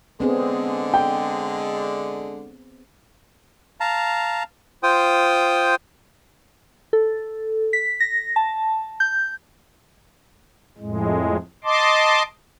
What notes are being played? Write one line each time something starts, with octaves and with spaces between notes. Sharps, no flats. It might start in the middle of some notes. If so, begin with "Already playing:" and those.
D3 G#3 B3 C4 G#4
G5
F5 A5 A#5
F4 C5 G5 D#6
A4
B6
A#6
A5
G6
F2 A2 G#3
D#5 A5 C6 D6